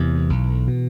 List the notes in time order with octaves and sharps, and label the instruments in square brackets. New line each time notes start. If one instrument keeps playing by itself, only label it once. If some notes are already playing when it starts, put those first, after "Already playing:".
Already playing: [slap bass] E2 C3 E3
B1
B2